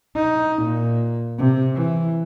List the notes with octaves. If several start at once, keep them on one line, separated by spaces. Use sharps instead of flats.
D#4
A#2
C3
E3